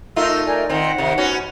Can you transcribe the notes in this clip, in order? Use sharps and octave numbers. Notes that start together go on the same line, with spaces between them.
A3 D#4 F4 A#4 E6
A#4 D5 G#5
D#3 C4 F#5
C3 D#3
B3 C#4 F#4